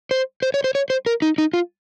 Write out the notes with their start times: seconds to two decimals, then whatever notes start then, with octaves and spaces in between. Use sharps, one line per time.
0.11 C5
0.42 C5
0.54 C#5
0.64 C5
0.75 C#5
0.90 C5
1.06 A#4
1.22 D#4
1.38 D#4
1.54 F4